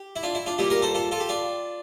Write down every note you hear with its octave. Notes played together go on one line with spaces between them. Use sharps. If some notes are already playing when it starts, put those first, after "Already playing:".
Already playing: G4
E4
D4 F4
E4
D4 F4
A#2 G3 E4 G4
G4 A#4
A4 C5
F4 A4
F4 A4
G4
D4 F4